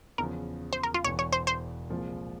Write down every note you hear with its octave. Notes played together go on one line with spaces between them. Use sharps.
E2 C#3 F3 A#4
C5
A#4
F4
E1 E2 E3 C#5
C#5
C5
C5
C2 A#2 F3 G#3